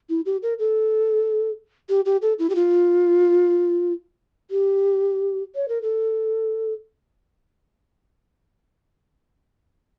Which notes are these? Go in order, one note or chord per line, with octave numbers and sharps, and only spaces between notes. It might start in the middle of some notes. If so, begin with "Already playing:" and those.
E4
G4
A#4
A4
G4
G4
A4
E4
G4
F4
G4
C#5
A#4
A4